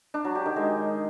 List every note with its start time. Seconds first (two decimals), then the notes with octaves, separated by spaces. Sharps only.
0.14 D4
0.25 F#3
0.35 G4
0.46 D#3
0.56 G#3